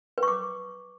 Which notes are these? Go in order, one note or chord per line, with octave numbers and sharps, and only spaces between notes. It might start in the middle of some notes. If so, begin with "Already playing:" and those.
B4
C#6
D6